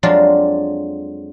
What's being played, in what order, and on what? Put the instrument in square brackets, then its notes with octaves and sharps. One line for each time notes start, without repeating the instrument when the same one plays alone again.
[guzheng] F2 F#3 G#3 D4 F4